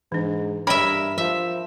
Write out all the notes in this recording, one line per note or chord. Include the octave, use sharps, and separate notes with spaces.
G#2 E3 D4
G2 A#4 C#5 E5 G5 B5
F3 E5